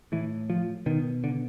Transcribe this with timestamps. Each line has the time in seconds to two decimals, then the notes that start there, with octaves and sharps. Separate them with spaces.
0.12 A2 E3
0.50 F3
0.86 B2 D#3
1.24 D3